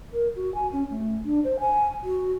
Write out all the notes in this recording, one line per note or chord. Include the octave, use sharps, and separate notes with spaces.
A#4
F#4
G#5
C#4
A3
D4
C5
G#5
F#4